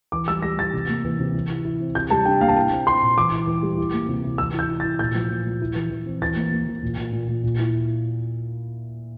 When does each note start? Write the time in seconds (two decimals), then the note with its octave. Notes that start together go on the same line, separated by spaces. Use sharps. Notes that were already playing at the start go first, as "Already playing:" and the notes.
0.12 E3 D6
0.28 G3 E6
0.42 G3 A#6
0.59 E3 A6
0.73 C3
0.89 A#3
1.05 E3
1.19 C3
1.34 E3
1.49 E4
1.65 E4
1.80 C4
1.95 C3 G6
2.10 G3 A5
2.25 D4 G5
2.41 A#3 F5
2.48 A5
2.56 E4 G5
2.71 C4
2.87 C4 C6
3.02 A#2
3.18 E3 D6
3.32 E4
3.47 E3
3.63 G3
3.77 E4
3.93 A#3
4.08 C3
4.24 E4
4.38 E3 E6
4.54 E4
4.59 G6
4.69 E4
4.80 E4 A6
4.99 A#2 G6
5.15 F3
5.30 A#2
5.46 F3
5.61 E4
5.75 E3
5.90 E3
6.06 C4
6.22 E3 A6
6.36 A#3
6.52 A#3
6.68 E3
6.83 A#2
6.97 A#2
7.13 A#2
7.28 A#2
7.43 A#2
7.59 E4